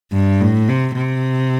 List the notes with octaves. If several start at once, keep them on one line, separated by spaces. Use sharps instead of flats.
G2
A2
C3
C3